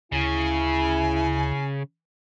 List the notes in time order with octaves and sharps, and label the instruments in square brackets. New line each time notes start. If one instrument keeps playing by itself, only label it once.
[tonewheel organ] D2 [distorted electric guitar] C#3 [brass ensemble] E4 [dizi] G#5